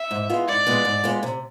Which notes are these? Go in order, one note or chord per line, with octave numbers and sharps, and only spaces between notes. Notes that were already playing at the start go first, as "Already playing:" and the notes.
Already playing: E5
G#2
G#3 B3 F4
G#2 D5
G#3 B3 F4
G#2
G#3 B3 F4
C3